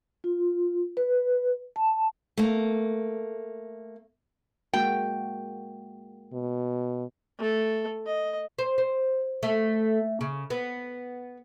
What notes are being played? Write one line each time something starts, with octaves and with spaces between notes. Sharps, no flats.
F4
B4
A5
A3 A#3
G#3 A#3 F#4 G5
B2
A3 A4
D#5
C5
C5
A3
C#3
B3